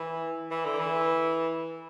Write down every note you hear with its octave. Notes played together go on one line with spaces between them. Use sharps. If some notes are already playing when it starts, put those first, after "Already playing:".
Already playing: E3
E3
D3
E3